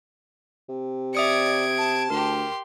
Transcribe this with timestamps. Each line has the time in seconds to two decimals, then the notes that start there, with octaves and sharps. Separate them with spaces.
0.69 C3
1.15 D5 E5 D#6 G#6 C#7 D7
1.78 A5
2.10 D2 G4 A#4 C6